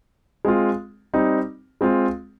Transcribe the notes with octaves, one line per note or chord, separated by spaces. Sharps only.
G#3 C4 F4
G3 C4 D#4
G#3 C4 F4